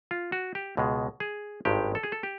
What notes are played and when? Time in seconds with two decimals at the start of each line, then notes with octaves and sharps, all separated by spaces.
0.11 F4
0.32 F#4
0.55 G4
0.77 C#2 B2 G#3
1.20 G#4
1.65 G#1 G2 D#3 G#3 G4
1.95 A4
2.03 G#4
2.12 A4
2.23 G4